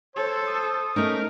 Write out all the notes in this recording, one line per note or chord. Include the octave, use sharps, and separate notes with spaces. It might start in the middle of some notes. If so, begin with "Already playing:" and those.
A4 C5 C#5
D#6
A3 C#4 D#4 A#4